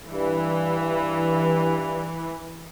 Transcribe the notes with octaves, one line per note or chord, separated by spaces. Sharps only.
G2 E3